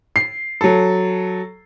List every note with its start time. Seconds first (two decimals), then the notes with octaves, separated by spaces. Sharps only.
0.16 C7
0.61 F#3 A4